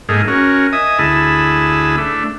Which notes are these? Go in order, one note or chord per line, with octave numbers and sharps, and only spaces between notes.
G#2 A3 A#3 D#4 G#4
C#4 F#4 A#4
D#5 E5 G#5 D#6
D2 E4 G#4 A5 B5 E6
A3 D4